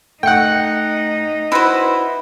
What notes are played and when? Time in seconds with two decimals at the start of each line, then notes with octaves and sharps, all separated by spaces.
0.23 A3 D#4 F#5 G5 C#7
1.52 E4 F#4 B4 C5 E6